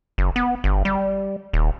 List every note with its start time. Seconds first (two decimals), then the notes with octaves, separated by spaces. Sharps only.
0.18 F#1
0.36 B3
0.64 G1
0.85 G3
1.53 D#1